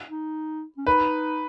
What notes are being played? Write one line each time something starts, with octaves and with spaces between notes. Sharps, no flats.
D#4
C#4
D#4 B4